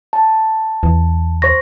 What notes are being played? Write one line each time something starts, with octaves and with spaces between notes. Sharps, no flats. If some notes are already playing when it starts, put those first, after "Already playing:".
A5
E2
C5 C#6 A#6